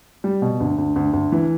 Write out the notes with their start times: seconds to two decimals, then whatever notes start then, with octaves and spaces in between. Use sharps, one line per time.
0.24 G3
0.42 B2
0.60 D2
0.78 D2
0.96 D2
1.13 D2
1.32 E3